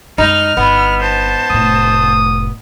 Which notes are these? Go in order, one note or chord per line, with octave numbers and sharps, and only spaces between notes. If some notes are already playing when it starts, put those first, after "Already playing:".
F#2 G#3 D#4 F6
G1 B3
C5 A5
F1 A2 D#6